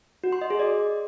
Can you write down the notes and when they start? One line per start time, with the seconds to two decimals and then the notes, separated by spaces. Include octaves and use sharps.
0.24 F#4
0.33 C6
0.41 D#5
0.50 G#4
0.59 D5